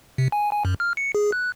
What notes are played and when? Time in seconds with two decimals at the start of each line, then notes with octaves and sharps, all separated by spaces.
0.18 C3
0.32 G#5
0.52 G#5
0.65 F#2
0.80 F6
0.97 C#7
1.15 G#4
1.32 F#6